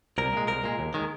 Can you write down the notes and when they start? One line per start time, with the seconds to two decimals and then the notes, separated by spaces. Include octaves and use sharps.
0.18 C2 A#4
0.33 A#2 G#3
0.48 C2 A#4
0.63 A#2 G#3
0.79 D#2
0.94 D#3 G#3